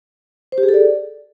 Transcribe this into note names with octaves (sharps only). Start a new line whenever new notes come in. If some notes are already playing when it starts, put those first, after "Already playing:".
C5
G4
G#4
A4
D5